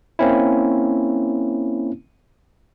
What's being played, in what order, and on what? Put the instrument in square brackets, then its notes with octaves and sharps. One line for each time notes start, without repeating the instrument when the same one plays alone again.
[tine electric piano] A#3 C4 C#4 E4